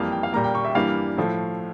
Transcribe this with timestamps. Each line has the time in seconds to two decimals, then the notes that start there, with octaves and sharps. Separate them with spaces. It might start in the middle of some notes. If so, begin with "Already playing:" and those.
Already playing: F2 E3 G3 A#3 F5
0.12 G5
0.23 F5
0.33 A#2 G3 A#3 A#5
0.44 G5
0.55 C#6
0.65 E5
0.75 G2 E3 G3 A#3 F5
1.17 A2 F3 A3